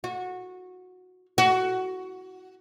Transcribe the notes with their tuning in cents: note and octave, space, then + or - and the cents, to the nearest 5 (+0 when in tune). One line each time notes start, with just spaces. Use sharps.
F#4 -15
F#4 +10